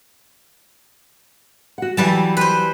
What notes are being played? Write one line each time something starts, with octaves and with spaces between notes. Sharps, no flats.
F#4 F#5
E3 F#3 G3 E5 A5
B4 C5